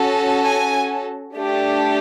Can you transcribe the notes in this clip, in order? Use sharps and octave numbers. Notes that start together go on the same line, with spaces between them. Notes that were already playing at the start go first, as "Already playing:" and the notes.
Already playing: C#4 F#4 A4
G#5
A3 D4 G4